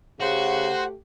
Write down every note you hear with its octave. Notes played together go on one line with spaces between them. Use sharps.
C#3 A3 F#4 G4 C5 F#5